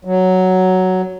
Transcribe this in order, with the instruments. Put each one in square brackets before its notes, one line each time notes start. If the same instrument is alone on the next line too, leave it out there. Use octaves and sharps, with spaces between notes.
[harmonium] F#3